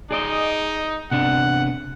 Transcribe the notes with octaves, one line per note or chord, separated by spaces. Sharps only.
D#4 G#4 D5 D#5
C3 B3 D4 F#5